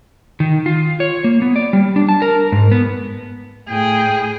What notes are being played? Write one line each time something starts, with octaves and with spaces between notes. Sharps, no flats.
D#3
F4
C#5
A#3
B3
D5
G3
D4
A5
A#4
G#2
B3
A2 G#4 G5